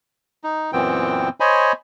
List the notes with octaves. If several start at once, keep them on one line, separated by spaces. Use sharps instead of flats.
D#4
F#2 A#2 E3 B3 C4 G5
C5 C#5 D#5 G#5 B5